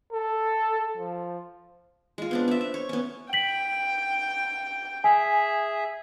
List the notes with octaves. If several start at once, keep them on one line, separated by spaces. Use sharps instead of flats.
A4
F3
G#3 F4
B3 C4 D4
C4 E5
E5
C#5
B3 C#4
G5 B6 F#7
G#4 E5 G#5